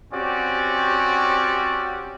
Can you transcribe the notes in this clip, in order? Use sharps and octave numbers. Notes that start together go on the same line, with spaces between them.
C4 C#4 F#4 G4 D5